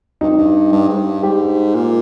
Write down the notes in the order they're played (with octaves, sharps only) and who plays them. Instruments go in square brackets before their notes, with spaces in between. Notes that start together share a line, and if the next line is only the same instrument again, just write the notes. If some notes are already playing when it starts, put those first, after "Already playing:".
[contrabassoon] G2 [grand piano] D#4
[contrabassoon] F2
G2
G2
G#2
G2
[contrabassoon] G#2 [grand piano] G4
[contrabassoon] A#2